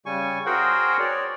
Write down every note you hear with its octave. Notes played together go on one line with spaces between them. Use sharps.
C#3 G3 G#5 C#6
F#4 G#4 A#4 C5 F#5 G5
C#5 D5